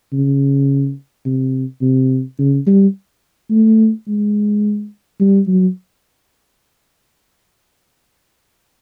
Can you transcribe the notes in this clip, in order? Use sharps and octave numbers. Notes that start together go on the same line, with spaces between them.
C#3
C3
C3
C#3
G3
A3
G#3
G3
F#3